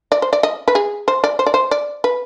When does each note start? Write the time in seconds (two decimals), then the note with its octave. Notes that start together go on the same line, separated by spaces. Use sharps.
0.12 D5
0.22 C5
0.33 D5
0.43 D#5
0.68 B4
0.75 G#4
1.08 C5
1.24 D5
1.39 C5
1.46 D5
1.54 C5
1.71 D5
2.04 B4